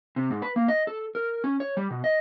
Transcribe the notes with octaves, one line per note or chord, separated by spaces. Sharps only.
C3
G#2
B4
A#3
D#5
A4
A#4
C#4
C#5
G3
B2
D#5